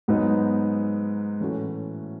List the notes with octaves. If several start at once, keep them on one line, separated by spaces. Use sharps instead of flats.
G#2 F#3 B3 D#4
A2 E3 A3 C#4 F#4